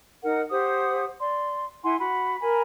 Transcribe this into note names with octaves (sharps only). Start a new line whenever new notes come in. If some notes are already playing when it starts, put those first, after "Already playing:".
D#4 A#4 F#5
G4 C5 F#5 D#6
D5 C6
E4 F#5 G#5 C6
F#4 F#5 B5
A#4 G#5 B5